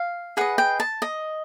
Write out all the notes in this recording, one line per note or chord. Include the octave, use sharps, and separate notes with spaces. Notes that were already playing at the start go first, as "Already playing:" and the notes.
Already playing: F5
G#4 B4 D#5 F#5
G5
A5
D#5